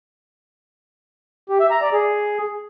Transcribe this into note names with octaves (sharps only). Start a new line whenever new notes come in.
G4
E5
A#5
D5
G#4